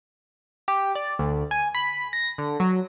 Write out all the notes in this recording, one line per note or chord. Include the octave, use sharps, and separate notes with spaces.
G4
D5
D2
G#5
B5
A#6
D3
F#3